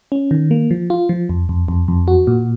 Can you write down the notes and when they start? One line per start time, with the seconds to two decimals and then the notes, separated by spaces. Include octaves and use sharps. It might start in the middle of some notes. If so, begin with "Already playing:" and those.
0.12 C#4
0.31 D#3
0.51 A#3
0.71 F3
0.90 F4
1.09 F3
1.29 F2
1.49 F2
1.68 F2
1.88 F2
2.08 F#4
2.27 A#2